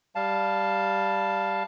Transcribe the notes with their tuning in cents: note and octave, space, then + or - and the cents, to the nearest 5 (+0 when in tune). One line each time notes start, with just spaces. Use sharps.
G3 +0 F5 +0 A5 +0